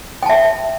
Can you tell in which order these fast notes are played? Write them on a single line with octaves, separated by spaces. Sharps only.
G5 A5 E5